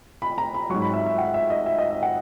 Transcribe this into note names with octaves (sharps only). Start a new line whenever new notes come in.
B5
A#5
B5
G#2 F#3 C#6
B5
E5
E5
F#5
E5
D#5
E5
D#5
E5
F#5